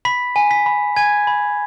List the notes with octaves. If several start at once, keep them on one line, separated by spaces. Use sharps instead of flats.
B5 B6
G#5
B6
B5
G#5 G#6
B5